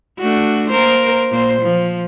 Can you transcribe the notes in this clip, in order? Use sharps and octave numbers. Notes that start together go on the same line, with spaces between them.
A3 D4 F#4
A#3 A#4 C5
A#2 A#3 C5
F3